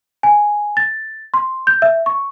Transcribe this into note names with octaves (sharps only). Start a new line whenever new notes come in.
G#5
A6
C6
G6
E5
C#6